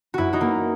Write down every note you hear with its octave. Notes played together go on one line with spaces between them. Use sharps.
F#2 E4 F#4
D#4 F#4
A#3